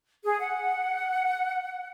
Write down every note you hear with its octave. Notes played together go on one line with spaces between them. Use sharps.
G#4
F#5